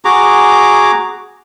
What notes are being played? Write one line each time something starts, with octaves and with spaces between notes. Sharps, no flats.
F#4 G#4 A#5 D6